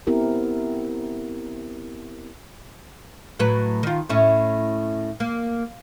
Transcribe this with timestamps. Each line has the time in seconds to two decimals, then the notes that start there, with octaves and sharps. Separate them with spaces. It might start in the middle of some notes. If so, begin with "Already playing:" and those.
0.07 B3 C4 E4 G4 A#4
3.39 A2 F#3 B4
3.83 D#3 F4
4.09 A2 C#4 E4
5.20 A#3